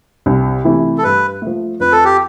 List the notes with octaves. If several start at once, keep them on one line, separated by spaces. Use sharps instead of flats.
C2
C3 E3 A3 E4
A4
G2 B4
F3 A3
F2 B4
A4
G4